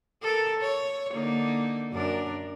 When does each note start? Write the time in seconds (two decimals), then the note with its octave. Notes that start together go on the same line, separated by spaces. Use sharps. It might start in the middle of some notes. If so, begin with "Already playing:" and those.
0.22 A4 A#4
0.59 C#5
1.14 D3 A#3 D#4
1.92 F#2 D4 A#4